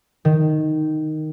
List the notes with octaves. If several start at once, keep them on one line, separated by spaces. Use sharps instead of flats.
D#3